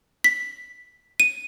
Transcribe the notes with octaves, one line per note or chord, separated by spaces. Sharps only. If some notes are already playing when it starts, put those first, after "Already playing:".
B6
D#7